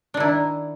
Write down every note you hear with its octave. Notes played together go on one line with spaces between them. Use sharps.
D#3 D4 E4